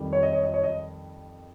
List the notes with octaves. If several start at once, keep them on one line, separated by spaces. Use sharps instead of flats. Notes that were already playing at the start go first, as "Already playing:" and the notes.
Already playing: F2 D#3 G3
C#5
D#5
C#5
D#5
C#5
D#5